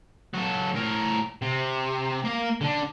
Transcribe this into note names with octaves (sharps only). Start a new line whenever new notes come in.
F#3 A4
A2 A#4
C3
A#3 F5
D3 D4